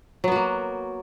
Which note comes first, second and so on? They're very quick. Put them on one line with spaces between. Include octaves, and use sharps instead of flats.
F#3 B3 F#4 A#3